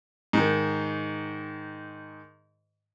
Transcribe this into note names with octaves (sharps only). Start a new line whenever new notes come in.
G#2 D#3